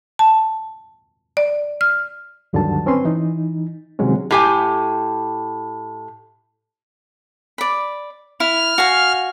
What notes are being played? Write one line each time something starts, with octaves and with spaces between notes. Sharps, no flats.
A5
D5
F6
D2 G2 D3 D#3 F#3 A5
C4 C#4 B4 C6
E3 D#4
C3 D#3 F#3 G#3 C#4
A2 G4 G#5
D5 B5
E4 F6
F#4 F5 G#5